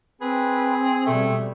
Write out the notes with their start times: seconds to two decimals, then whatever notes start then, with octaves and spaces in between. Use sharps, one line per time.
0.21 C4 G#4 B4
1.06 B2 G3 A3 B3